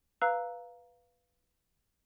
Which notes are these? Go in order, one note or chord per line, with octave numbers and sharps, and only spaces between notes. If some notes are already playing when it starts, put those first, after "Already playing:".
B4 F5 A#5 E6 F#6